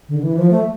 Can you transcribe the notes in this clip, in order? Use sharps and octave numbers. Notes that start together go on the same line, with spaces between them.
D3
D3
E3
F3
A3